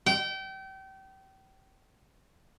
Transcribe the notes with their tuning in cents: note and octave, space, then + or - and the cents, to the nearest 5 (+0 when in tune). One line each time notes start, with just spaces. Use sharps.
G5 -30